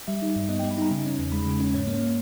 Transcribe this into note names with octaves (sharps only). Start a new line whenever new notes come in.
G3 E5
D#4
G2
B3 D#5
G5
G3
B5
D#4 A#5
C#3
C#4
E2
G#3 B5
C#3
C#4
G#2 C#5
A#3